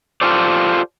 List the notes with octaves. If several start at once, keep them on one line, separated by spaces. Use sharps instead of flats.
F4 G4 A4 C5 D5